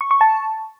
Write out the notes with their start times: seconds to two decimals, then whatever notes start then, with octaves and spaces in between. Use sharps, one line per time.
0.01 C#6
0.11 C#6
0.21 A5